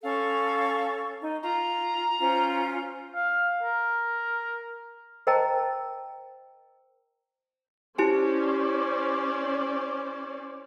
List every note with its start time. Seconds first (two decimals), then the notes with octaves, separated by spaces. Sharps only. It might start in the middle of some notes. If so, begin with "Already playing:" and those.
0.03 C#4 A4 F5 C#6
1.22 D#4
1.43 F4 A#5
2.19 C#4 F4 C5
3.15 F5
3.63 A#4
5.27 A#4 C5 D#5 G5 A5 A#5
7.98 C#4 E4 G4 C5 D5 G#5